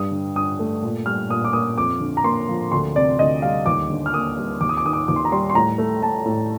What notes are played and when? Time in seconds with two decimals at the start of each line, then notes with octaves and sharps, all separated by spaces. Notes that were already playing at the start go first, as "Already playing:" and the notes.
Already playing: G2 G3 D#6
0.11 D3
0.35 G2 D#6
0.59 A3
0.82 A#2
1.06 G3 F6
1.29 A#2 D#6
1.44 D6
1.53 A#3 D#6
1.78 F2 D6
2.00 D3
2.17 A#5
2.24 A#3 C6
2.49 F3
2.72 D2 C6
2.96 C3 D5
3.19 D2 D#5
3.42 G3 F5
3.66 D#2 D6
3.90 D3
4.06 F6
4.13 A#3 D#6
4.38 G3
4.60 D#2 D6
4.69 D#6
4.77 D6
4.85 D#3 D#6
4.93 D6
5.08 D#2 D6
5.16 C6
5.25 A#5
5.32 G3 C6
5.50 C6
5.55 A2 A#5
5.78 A3
6.03 A3 A5
6.26 A2